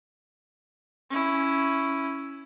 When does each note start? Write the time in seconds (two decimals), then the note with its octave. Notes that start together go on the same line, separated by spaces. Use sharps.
1.10 C#4 E4